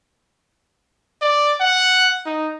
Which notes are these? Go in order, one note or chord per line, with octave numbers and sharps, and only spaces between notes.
D5
F#5
D#4